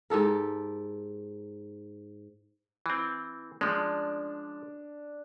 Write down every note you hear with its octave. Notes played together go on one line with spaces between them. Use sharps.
G#2 G4 A4 A#4
E3 C4
F3 G#3 D4